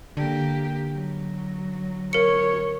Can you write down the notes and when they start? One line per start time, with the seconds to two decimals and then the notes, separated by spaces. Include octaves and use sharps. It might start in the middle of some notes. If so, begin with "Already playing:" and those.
0.17 D3 A#3 G4
0.94 F#3
2.13 A#4 C#5 C#7